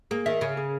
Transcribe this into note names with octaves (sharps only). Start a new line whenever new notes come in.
A#3 G#4
D#3 E5
C#3 G#4
G#4